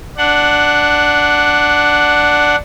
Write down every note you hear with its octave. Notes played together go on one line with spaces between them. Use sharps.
D4 F#5